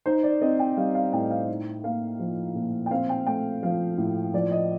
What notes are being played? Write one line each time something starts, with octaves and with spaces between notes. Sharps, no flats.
D#4 C5
D5
C4 D#5
G5
G3 F5
F5
A2 G5
F5
D#4
A#3 F5
F3
A#2
G5
C4 F5
G5
A3 G5
F3 F5
A2
F3 D5
D#5